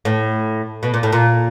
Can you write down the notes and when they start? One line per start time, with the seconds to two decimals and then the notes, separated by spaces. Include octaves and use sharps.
0.05 A2
0.83 B2
0.94 A#2
1.03 A2
1.12 A#2